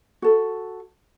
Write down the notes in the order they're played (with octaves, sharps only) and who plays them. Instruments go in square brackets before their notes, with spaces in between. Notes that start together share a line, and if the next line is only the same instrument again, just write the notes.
[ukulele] F#4 A4